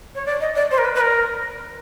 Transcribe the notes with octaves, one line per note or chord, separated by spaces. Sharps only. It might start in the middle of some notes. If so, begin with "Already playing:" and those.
C#5
D5
D#5
D5
C5
A#4
B4
B4
A#4